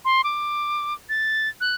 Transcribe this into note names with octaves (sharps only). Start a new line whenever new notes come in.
C6
D6
A6
F#6